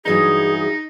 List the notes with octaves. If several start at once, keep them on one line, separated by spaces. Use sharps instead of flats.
G2 E3 F#3 D#4 G#4